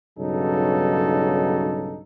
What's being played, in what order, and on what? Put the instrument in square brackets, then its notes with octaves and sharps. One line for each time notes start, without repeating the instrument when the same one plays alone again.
[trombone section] B1 G2 C#3 F#3 D#4 A4